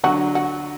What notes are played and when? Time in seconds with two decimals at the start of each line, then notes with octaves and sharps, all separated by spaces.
0.04 D3 F#3 F#4
0.35 F#4